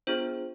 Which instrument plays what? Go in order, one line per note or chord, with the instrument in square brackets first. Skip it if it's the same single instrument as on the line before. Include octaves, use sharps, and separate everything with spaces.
[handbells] B3 D4 F4 G#4 C5